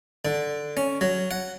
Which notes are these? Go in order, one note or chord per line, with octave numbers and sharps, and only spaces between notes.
D3
C#4
F#3
F#5